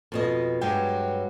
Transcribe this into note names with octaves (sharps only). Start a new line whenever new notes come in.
F2 B2 D#5
G2 F#3 G#3 G5